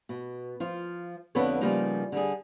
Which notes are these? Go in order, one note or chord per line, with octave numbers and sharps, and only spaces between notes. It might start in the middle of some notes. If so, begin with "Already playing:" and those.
B2
F3 F4
F2 D3 B3 A4 B4 C#5
C#3 F3 G3 A#3 B3 D#4
D3 G3 G#4